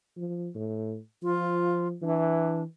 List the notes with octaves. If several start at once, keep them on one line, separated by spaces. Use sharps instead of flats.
F3
A2
F3 F4
E3 D4